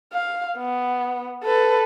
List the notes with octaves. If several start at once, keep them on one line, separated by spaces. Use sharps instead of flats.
F5
B3
A4 B4